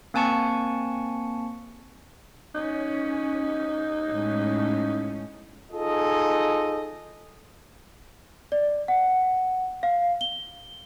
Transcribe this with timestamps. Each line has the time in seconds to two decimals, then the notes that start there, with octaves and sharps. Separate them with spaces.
0.14 A#3 C4 G#5 A5 C#6 C#7
2.55 C#4 D#4
4.10 A2 G#3 C#4
5.72 D#4 F4 G#4 A4 D#5
8.52 D5
8.88 F#5
9.83 F5
10.21 G7